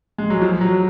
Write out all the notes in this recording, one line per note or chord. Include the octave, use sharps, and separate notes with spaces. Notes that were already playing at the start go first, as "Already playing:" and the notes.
G#3
F#3
F3
F#3